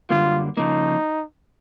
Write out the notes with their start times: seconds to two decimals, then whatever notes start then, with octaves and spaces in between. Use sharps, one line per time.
0.10 F#2 D3 G3 A#3 F4
0.57 C#3 F3 A#3 D#4